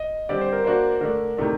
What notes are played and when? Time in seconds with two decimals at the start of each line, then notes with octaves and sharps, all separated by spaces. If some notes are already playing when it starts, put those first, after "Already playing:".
Already playing: D#5
0.29 D3 G3 C4 G4 D5
0.41 C5
0.53 A#4
0.64 A#3 D4 F#4 C5
1.01 D3 A3 D4 A#4
1.37 C3 D#3 A3 D4